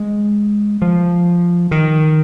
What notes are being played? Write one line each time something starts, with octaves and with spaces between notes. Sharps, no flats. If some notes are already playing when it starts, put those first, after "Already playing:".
Already playing: G#3
F3
D#3